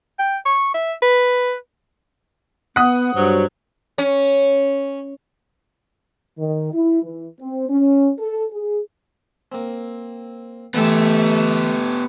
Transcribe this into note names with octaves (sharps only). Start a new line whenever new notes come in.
G5
C#6
E5
B4
B3 F#5 D#6
G2 F#3 C5
C#4
D#3
E4
E3
C4
C#4
A4
G#4
A#3 C4
E3 A3 B3 G4 E5